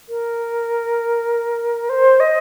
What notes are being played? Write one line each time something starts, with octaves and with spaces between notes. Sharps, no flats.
A#4
C5
D#5